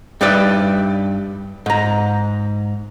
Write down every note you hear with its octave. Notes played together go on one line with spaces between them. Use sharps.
G2 G3 D#4 B4 D5 E5
G#2 A#5